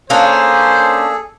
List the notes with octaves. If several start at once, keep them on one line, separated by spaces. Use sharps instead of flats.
A#3 C#4 D4 G#4 A4 C5